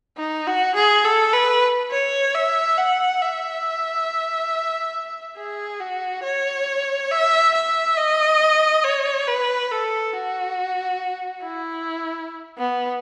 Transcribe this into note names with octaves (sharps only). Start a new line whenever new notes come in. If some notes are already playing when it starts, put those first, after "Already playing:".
D#4
F#4
G#4
A4
B4
C#5
E5
F#5
E5
G#4
F#4
C#5
E5
E5
D#5
C#5
B4
A4
F#4
E4
B3